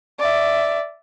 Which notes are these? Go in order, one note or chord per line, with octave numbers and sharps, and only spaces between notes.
D5 E5